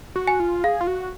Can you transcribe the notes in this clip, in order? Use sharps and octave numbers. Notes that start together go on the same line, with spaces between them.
F#4
G#5
F4
G#4 F5
F4
F#4